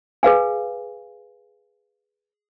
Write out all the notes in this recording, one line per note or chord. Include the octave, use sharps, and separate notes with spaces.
G#4 B4 F5 G#5